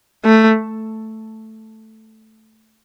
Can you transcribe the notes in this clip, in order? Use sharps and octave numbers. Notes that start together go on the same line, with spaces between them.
A3